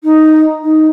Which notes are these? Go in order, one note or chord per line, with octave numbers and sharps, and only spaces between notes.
D#4
D#4